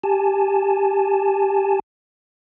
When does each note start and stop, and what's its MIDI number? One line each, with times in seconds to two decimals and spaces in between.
0.04 1.80 67
0.04 1.80 80
0.04 1.80 81